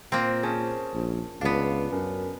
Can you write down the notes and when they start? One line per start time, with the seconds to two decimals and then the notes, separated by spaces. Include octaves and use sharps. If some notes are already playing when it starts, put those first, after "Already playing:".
0.12 A#2 A#3 C4 A#5
0.43 C#4 G#4 C5 A5
0.93 A#1
1.41 C#2 B3 D4 F5
1.92 F#2 C#4 A#4